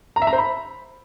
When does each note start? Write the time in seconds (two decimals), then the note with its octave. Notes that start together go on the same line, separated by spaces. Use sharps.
0.16 A#5
0.22 E5
0.27 A#5
0.33 C5
0.38 B5